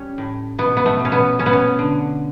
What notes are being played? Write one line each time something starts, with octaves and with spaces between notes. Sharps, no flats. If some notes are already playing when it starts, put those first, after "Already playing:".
Already playing: G3 C#4
A2
B2 B3
B3
A3
B2
C#4
B3
A3 C#4
B3
C#4
D3